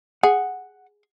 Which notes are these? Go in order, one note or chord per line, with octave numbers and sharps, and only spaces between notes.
G#4 F#5